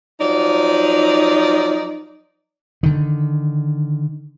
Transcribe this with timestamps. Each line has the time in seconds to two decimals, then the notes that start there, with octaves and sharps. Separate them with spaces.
0.20 F3 F#3 D#4 D5
2.83 D3 D#3